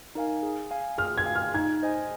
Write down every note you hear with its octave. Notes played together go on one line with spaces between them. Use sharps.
D#4 A#4 F5 G#5
G#4
F5 G#5
G#4 F6
G#6
F5 G#5
F6
D#4 G#6
C5 D#5 G#5